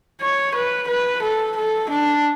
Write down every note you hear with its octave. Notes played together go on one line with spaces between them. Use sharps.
C#5
B4
B4
A4
A4
D4